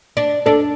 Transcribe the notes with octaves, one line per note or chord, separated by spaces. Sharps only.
D4
D4 A4